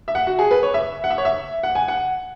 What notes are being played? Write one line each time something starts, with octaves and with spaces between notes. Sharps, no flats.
E5
F#5
F#4
G#4
B4
C#5
E5
F#5
E5
C#5
E5
F#5
G#5
F#5